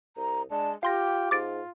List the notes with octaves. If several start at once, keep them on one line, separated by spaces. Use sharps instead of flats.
C2 A#5
G#3 D4 A5
F4 G4 F5 G5 C6 A#6
G#2 F4 D6 A6 D7